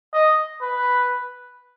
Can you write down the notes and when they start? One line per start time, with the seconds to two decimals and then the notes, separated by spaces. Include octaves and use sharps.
0.13 D#5
0.61 B4